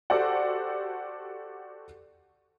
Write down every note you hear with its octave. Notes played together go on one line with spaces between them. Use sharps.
F#4 G4 A4 C5 D5 F#5